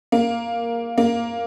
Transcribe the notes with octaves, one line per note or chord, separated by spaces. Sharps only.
A#3
A#3